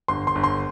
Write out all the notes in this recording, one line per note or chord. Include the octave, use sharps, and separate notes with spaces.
G1 C6
C6
G1
C6